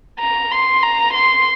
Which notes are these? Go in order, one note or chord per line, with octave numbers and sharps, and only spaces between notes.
A#5
C6
A#5
C6